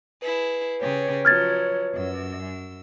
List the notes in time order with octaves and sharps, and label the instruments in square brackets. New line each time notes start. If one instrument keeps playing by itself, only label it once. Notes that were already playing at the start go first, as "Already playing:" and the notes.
[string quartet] E4 G#4 [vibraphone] B4
[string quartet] C#3 G4 G#4 [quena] C#5
[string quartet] F3 F#3 [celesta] F6 G#6 A6
[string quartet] F#2 E6